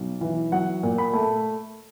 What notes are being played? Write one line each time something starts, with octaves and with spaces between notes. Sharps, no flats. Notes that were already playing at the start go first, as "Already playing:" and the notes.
Already playing: B1
E3
F#3 F#5
A#2
B5
A3